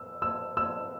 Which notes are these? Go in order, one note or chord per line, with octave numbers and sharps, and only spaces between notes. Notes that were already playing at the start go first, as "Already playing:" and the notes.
Already playing: E6
E6
E6